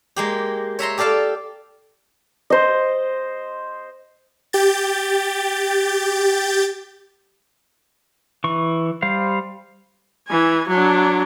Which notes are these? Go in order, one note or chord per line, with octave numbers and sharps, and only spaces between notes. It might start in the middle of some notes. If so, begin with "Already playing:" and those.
G#3 A#3 G4
C#5 E5 A#5 C6
G4 A4 D5 F5 A5
C5 D#5
G4 G6 A6
E3 C#6
G3 C5 F5
E3 G#5
F#3 D4